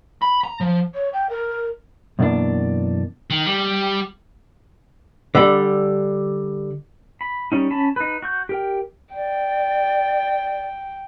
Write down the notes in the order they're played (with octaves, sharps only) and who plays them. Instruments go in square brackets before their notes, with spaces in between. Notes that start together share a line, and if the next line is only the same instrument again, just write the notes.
[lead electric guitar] B5
A#5
F3
[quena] C#5
G5
A#4
[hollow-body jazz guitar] F#2 B2 E3 A#3 D4
[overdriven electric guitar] D#3
G3
[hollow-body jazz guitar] D3 G3
[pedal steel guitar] B5
G3 C#4 D#4
C#4 A5 B5
D#4 B4
F#4 C#6 G6
G4 A#4 G5
[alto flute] D5 [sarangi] G5